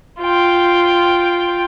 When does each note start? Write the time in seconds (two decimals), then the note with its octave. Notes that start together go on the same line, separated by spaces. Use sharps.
0.20 F4 G5